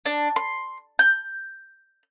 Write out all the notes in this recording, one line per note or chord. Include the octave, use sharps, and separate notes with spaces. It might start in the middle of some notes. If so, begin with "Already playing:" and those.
D4
C6
G6